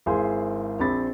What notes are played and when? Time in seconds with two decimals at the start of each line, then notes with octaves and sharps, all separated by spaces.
0.06 G#1 E4 G#4 C5 F5 C6
0.80 A#1 C4 B5 A6